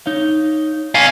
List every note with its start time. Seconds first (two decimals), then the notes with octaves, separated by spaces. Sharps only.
0.06 D#4 C#5 F5
0.95 F5 G#5